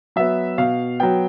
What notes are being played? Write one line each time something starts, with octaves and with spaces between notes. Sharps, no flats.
F#3 B3 E5
B2 F5
F#3 B3 G5